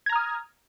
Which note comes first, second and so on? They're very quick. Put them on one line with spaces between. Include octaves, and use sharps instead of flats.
G#6 A#5 F6 D#6